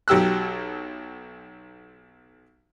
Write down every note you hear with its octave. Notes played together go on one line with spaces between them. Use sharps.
B1 F#3 G4 E6 F#6